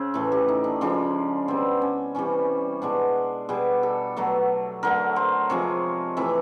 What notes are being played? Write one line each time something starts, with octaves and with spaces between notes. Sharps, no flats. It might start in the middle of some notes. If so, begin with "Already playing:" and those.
Already playing: C#3 C4
A2 E3 A3
G4
D#4
D4
C#3 F3 G#3 D4
B2 G3 C4
C#4
C3 E3 G3 C#4
B2 G#3 D4
B2 G3 G#4
A4
B2 F#3 A3
D3 F#3 A3 A#4
C5
C3 F3 G#3 C#5
C3 E3 A3 E5